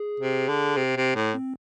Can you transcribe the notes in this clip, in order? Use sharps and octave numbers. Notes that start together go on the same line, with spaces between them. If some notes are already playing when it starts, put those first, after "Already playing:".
Already playing: G#4
C3
D3
C3
C3
A2
C4